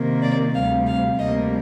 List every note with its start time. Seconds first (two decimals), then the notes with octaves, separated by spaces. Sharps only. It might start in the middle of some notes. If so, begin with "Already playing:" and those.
Already playing: C3 D#3 A#3
0.22 D5
0.54 D2 C3 G3 F5
0.87 F5
1.19 D2 C3 G3 A#3 D#5